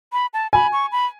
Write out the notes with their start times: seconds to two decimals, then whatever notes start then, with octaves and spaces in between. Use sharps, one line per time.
0.13 B5
0.34 A5
0.53 G#5 B5
0.72 C#6
0.92 B5